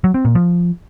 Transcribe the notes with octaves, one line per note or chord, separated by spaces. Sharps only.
F#3
C4
A#2
F3